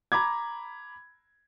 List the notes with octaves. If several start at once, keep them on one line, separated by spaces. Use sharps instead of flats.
A#5 B5 D6 G#6